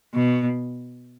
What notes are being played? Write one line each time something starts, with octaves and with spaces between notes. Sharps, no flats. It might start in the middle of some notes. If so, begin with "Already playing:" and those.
B2